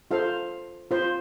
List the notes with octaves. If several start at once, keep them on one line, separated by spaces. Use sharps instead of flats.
F4 A4 C5 F5
F4 C5